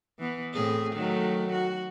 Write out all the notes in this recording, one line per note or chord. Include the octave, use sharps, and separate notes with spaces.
E3 B3
A2 C4 G#4
D#3 F#3 A3
F#4